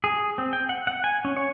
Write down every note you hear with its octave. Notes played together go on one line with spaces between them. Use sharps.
G#4
C4
G5
F#5
F#5
G#5
C#4
C#5